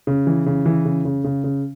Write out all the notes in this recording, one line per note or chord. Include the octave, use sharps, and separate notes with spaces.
C#3
E3
C#3
E3
C#3
C#3
C#3
C#3